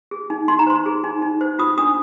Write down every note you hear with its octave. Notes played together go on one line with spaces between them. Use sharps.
G#4
D#4
D#4 C6
A#5
C5 C6
G#4
D#4
D#4
C5
F4 D#6
D4 D#6